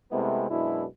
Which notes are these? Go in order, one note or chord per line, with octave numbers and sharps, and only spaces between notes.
C3 G#3 A3 B3 C4 E4
F#2 B2 G#3 D4 E4